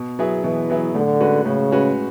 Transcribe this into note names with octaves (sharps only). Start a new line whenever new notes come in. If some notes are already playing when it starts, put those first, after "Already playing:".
Already playing: B2
F#3 B3 E4 G#4
B2 E3
F#3 B3 E4 G#4
A2 D3
G#3 C#4 F#4 B4
A2 C#3
G#3 C#4 F#4 B4